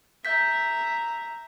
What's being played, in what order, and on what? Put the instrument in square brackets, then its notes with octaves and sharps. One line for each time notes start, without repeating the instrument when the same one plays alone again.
[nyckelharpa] E5 A#5 [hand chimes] G6 B6